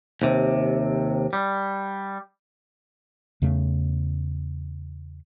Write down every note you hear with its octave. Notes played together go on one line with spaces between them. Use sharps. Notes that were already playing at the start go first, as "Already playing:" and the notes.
D#2 C3
G3
E2 C#3 A3